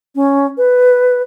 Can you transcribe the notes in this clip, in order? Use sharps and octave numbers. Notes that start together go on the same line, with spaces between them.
C#4
B4